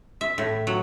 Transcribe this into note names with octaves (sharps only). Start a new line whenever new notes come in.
E5
A2
F#3